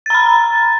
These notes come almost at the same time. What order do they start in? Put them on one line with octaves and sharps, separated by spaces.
A6 A#5 B5